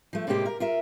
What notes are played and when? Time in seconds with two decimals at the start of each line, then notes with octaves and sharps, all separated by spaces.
0.13 F3 A3
0.27 A2 C3 G#3 A#3 G4 C5
0.46 A#4
0.60 F4 A#4 E5